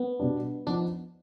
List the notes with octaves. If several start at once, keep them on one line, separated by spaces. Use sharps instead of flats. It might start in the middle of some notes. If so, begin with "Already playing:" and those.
Already playing: B3
B2 G3 D4
F3 B3 D4 D#4